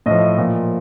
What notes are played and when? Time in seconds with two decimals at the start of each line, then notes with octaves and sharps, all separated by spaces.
0.06 A2 F3 D#5
0.38 A#2 F3